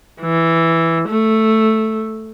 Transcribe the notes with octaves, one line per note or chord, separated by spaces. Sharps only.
E3
A3